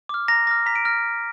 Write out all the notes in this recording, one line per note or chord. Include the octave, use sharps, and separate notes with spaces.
D6 F6
A#5 A#6
D6 F6 A#6
A#5 B6
D7
F6 A#6